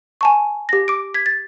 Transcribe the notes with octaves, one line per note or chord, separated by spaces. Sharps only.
G#5 A5 C#6
G4 A#6
D6 D7
G#6 B6
A6